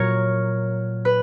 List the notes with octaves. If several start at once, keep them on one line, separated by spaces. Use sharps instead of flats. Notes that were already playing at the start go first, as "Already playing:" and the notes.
Already playing: A#2 F#3 A#4 C#5
B4